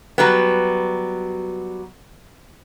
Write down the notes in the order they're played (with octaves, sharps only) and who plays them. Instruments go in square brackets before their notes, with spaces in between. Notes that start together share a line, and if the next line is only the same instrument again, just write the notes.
[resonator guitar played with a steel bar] F#3 G3 B3